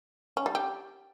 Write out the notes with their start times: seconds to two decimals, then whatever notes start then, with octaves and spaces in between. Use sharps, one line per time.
0.37 C#4
0.46 G3
0.55 G4